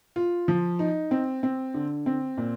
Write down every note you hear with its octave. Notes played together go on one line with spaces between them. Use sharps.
F4
F3
D#4
C4
C4
D3
C4
A#2